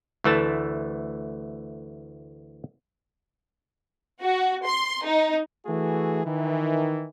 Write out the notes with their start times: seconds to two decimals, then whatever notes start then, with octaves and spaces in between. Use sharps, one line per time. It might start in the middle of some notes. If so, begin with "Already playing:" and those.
0.24 D2 E3 A3 A5
4.20 F#4
4.65 C6
5.04 D#4
5.66 E3 A3 F#4 G#4
6.25 D#3 E3